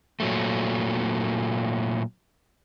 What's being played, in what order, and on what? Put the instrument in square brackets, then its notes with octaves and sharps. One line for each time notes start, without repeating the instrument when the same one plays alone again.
[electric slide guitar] A#2 F#3 A3